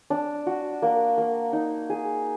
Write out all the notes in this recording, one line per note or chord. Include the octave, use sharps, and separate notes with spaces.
D4
F#4
A#3
A#3
D#4
G#4